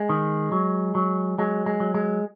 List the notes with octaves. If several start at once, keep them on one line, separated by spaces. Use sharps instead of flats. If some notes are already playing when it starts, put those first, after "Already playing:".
Already playing: G#3
D#3
F#3
F#3
F#3 G#3
G#3
F#3
G#3